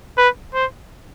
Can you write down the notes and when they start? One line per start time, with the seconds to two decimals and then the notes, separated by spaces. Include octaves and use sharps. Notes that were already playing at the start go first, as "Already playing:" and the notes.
0.18 B4
0.54 C5